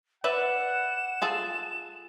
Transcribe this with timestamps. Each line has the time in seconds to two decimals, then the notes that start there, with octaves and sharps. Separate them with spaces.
0.24 B4 D5 E5 F#5 E7
1.22 F4 G#4 A4